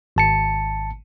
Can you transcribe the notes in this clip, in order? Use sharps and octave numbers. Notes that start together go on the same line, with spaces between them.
G#1 A5 C#7